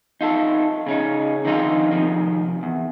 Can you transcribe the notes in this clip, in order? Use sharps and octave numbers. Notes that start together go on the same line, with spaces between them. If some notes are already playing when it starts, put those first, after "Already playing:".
D#4 F4 A4
C#3 C#4 D#4
D3 D#3 F3 C4 D#4 F4
C3 D#3 F3
E2